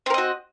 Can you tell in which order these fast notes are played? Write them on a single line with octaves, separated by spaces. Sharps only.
C4 A#4 D#5 F#4